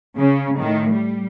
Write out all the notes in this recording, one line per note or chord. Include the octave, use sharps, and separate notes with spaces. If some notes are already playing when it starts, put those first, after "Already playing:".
C#3
A2 D#3
G3